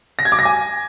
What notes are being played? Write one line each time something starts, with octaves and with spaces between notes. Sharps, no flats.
A#6
G#6
D6
A#6
G#5